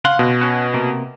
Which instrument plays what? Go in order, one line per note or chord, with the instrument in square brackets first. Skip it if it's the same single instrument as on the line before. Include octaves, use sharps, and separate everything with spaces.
[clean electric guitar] C#3 F#5 C6 [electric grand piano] F5
[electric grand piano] B2
[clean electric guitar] C#4 F#4
C3 A#3